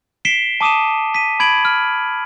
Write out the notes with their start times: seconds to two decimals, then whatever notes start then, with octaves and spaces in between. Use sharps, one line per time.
0.25 B6 C7 D7 E7 G7
0.61 A5 D6 D#6 D#7 E7
1.15 B6 D#7
1.40 B5 G#6 D7 F#7
1.65 F6